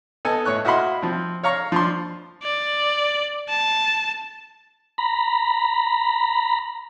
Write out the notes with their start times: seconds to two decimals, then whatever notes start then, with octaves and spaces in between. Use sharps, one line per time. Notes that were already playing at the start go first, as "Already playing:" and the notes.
0.25 B3 A4 D#5 G#5
0.45 A2 C#5 C#6 F#6
0.65 E4 F#4 D#5 F5 B5 C6
1.02 F3 C4
1.43 C#5 F5 A#5 C#6
1.72 F3 D4 C6
2.43 D5
3.49 A5
4.98 A#5 B5